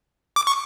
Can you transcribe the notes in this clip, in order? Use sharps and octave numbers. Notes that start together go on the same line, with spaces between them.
D6
C#6